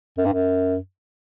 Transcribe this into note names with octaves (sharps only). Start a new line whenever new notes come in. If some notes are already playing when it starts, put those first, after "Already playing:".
F#2
G2
F#2